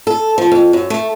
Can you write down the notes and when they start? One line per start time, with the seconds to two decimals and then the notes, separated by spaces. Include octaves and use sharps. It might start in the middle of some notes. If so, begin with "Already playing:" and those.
0.07 A4
0.38 F3
0.52 F2
0.73 F#2
0.90 A3